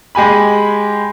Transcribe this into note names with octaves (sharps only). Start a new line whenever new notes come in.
G#3 G4 G#5 B5